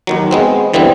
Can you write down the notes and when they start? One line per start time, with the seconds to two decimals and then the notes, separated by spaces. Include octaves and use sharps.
0.07 D#2 D#3 F#3
0.31 G#3 B3 C4
0.74 D3 E3 G3 B3 C4